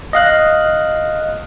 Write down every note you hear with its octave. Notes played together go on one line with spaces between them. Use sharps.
D#5 F5 F#6